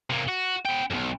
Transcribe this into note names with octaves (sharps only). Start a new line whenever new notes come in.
C3 A#3
F#4
B3 G5
B1 F2